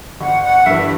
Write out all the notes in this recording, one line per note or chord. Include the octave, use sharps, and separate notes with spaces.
G1 F#5
F#5
G2 E3 E5